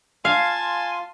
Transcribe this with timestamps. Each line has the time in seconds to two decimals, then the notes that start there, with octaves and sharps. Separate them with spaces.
0.25 F4 F5 G#5 A5 C6